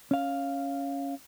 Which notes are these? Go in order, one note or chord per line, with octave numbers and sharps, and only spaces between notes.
C#4 F5